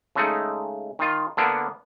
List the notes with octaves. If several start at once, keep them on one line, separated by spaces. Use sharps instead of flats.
C#3 G#3 A3 D#4
D#3 F4
D3 A#3 B3 D4